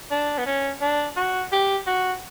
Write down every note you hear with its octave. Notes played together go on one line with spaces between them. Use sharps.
D4
B3
C#4
D4
F#4
G4
F#4